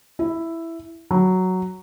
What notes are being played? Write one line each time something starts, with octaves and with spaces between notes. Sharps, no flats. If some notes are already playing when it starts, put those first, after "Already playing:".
E4
F#3